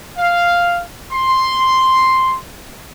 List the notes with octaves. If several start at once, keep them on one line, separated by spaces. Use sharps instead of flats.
F5
C6